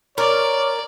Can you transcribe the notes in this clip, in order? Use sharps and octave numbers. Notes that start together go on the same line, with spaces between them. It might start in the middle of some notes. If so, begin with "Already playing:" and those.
A#4 C#5 D5